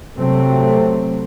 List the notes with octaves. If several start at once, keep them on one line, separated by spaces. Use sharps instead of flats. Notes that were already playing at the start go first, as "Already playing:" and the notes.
C3 F#3 A3 C4